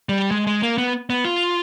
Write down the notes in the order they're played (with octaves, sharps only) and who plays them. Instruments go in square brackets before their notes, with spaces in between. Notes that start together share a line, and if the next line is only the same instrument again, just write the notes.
[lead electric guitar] G3
G#3
G#3
A#3
B3
B3
F4